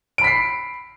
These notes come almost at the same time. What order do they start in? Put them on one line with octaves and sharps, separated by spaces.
D7 B5 B6 C7